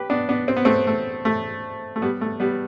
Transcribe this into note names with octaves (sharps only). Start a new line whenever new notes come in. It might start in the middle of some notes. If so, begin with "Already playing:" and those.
Already playing: G4 B4
B3 D4
B3 D4
C4
B3
A3 C4
A3
A3
A3
G3 B3
A3
G3 B3